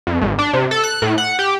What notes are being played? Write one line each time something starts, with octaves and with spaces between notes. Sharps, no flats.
F2
G#1
D4
C3
A4
F#6
A2
F#5
G4